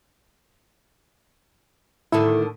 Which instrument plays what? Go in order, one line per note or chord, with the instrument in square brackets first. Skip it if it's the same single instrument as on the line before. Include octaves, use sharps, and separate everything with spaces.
[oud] A2 D3 D#3 [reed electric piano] E4 A4